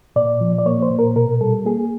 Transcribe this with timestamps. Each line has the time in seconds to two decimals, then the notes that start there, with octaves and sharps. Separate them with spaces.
0.16 A#2 D5
0.41 F3
0.59 D5
0.66 A#3 C#5
0.82 C5
0.91 A#2
0.99 A#4
1.16 B2 A#4
1.41 G3 A4
1.66 A#3 G#4